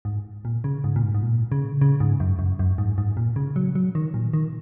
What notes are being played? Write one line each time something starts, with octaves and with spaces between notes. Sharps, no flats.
G#2
A#2
C#3
G#2
A#2
G#2
G#2
A#2
C#3
C#3
G#2
F#2
F#2
F#2
G#2
G#2
A#2
C#3
F#3
F#3
D#3
A#2
D#3